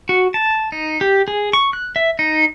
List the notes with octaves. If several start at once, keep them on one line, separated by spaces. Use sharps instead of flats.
F#4
A5
D#4
G4
G#4
C#6
F#6
E5
D#4